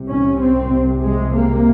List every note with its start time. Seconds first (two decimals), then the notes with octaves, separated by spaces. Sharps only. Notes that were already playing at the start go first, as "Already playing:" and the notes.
Already playing: C2 C3
0.10 C#4
0.41 C4
1.03 G#3
1.34 A#3